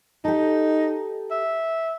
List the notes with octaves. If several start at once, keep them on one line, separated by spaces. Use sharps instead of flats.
D#4 G4 A4
E5